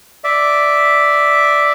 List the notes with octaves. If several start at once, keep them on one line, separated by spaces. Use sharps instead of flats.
D5 E5